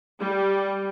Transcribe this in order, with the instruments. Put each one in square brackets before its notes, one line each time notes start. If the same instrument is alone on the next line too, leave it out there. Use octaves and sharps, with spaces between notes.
[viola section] G3